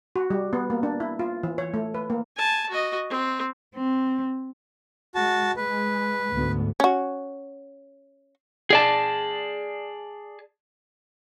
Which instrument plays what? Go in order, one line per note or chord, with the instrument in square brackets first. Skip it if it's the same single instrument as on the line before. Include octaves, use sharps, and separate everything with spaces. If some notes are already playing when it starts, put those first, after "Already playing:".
[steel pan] F#4
G3
B3
A#3
D4
E4
F4
E3
C#5
A3
B4
A#3
[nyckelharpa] G#5 A5
F#4 D#5
C4
[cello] C4
[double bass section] G#3 [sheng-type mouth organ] F#4 A5
[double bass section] G#3 [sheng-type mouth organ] B4
[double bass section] D2 G#2 B3
[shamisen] C#4 F#4
[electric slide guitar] G#4 D5 A5